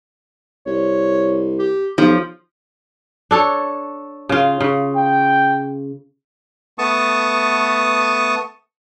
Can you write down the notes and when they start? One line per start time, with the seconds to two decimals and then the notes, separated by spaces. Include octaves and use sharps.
0.66 C2 C#5
1.59 G4
1.98 B1 F3 G4
3.31 D4 A4 C#5
4.29 C#3 F4
4.61 C#3
4.96 G5
6.78 A3 B3 A5 C#6 D#6